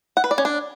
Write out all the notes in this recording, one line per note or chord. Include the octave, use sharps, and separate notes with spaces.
F#5
B4
D5
C#4
D4